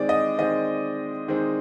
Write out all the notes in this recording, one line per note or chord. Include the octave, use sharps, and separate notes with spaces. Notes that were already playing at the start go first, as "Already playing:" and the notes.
Already playing: D#3 G#3 C4 D5
D#5
D#3 G#3 C4 D#5
D#3 G#3 C4